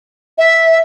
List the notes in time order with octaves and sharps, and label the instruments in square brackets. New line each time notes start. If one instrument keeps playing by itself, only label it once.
[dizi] E5